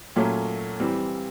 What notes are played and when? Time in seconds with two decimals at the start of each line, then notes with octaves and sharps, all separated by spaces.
0.16 A#2 F#3 A3 C#4
0.80 E3 G3 C4